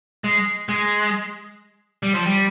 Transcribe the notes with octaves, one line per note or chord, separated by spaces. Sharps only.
G#3
G#3
G3
F3
G3